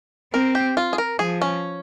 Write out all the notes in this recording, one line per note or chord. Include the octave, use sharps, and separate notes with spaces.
C4 A#4
G4
F4
G#4
A#4
F3 G#4
C#4